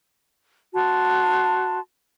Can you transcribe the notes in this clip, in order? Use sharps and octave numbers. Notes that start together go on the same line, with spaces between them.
F#4 A5 C6